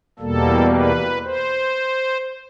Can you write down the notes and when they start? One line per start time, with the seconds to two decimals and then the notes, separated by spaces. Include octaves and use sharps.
0.19 E2 B2 G3 A#3 A4
0.71 B4
1.24 C5